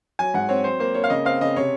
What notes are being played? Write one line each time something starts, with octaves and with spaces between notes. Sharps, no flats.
F#3 G#5
G#2 F#5
C4 C#5
F#3 C5
A#3 C5
A#3 C#5
F5
C#3 D#5
C4 F5
C#3 D#5
C3 C#5